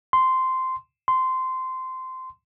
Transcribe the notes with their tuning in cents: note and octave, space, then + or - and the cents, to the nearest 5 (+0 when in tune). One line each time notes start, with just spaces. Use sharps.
C6 -10
C6 -15